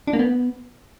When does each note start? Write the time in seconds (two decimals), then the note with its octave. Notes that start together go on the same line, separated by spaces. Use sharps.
0.07 D4
0.13 A#3
0.19 B3